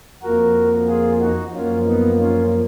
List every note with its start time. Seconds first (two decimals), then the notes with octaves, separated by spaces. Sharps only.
0.22 F2 F3 A#3 F#4 A#4
0.88 F4 G#4
1.21 D#4 F#4
1.54 F#2 F3 A#3 C#4 F4
1.87 B3 D#4
2.20 C#4 F4